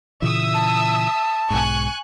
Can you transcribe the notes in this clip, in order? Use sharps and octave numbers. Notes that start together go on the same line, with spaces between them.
A#2 C#3 E3 E5 D#6 E6
A5
B1 G#2 G#5 C#6 F#6